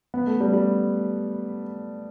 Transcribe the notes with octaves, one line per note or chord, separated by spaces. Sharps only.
B3
A3
G3
G3